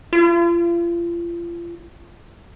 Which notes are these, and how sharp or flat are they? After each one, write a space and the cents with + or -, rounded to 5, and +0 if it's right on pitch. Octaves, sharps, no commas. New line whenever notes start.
F4 -35